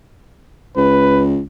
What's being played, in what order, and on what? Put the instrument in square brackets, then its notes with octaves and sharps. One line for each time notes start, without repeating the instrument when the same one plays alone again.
[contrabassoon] C#2 [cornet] B4